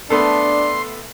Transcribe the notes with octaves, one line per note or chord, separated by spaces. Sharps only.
A3 B3 D4 A4 C6